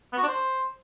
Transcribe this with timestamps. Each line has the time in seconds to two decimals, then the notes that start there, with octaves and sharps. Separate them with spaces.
0.13 B3
0.18 F#4
0.23 D4
0.28 C5